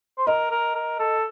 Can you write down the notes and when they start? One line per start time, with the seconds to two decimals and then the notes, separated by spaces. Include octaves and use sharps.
0.18 C5
0.27 A#4 D#5
0.51 A#4
0.75 A#4
0.99 A4